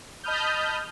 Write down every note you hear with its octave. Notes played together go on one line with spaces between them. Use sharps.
D#5 A5 B5 D#6 F6 G6